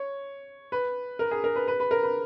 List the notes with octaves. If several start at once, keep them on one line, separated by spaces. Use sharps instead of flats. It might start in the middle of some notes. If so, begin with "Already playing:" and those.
Already playing: C#5
B4
A#4
G#4
A#4
B4
B4
B4
A#4
B4